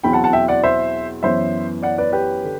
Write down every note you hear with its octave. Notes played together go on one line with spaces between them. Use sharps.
E2 B2 F#3 C4 E4 G5 B5
F#5 A5
F#5 A5
E5 G5
D5 F#5
C5 E5
F#2 E3 B3 C5 E5
D5 F#5
B4 D5
G4 B4
D3